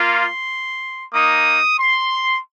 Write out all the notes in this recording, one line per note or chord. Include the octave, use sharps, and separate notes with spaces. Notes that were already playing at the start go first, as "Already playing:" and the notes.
Already playing: A#3 F4
C6
A#3 D#4 D#6
C6